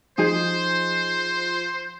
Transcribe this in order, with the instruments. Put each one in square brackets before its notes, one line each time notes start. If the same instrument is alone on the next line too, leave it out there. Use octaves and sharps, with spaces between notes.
[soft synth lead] F3 [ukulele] D#4 G#4 [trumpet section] C5